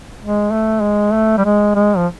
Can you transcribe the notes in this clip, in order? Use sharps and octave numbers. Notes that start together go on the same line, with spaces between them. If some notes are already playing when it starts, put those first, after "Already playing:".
G#3
A3
G#3
A3
G3
G#3
G#3
F3